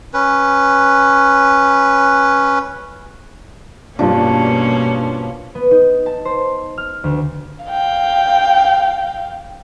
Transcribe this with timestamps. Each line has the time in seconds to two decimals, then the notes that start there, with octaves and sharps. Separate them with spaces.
0.13 C#4 B4
3.99 G2 B2 F3 A#3 C#4 D4
5.55 B3
5.71 D#4
6.06 A5
6.25 C5
6.78 F6
7.04 D2
7.65 F5 G5